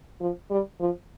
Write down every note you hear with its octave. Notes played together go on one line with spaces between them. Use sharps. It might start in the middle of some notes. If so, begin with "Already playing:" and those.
F3
G3
F3